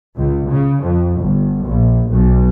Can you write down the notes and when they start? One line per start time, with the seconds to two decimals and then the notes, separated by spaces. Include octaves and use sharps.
0.17 C#2
0.49 C#3
0.82 F2
1.19 G1
1.65 A#1
2.10 B1